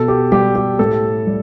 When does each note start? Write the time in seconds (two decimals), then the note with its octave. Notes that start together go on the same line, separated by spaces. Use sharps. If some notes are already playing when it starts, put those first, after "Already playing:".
Already playing: B2 A4
0.08 G4
0.32 G3 G4
0.55 G4
0.79 A2 A4
1.27 G3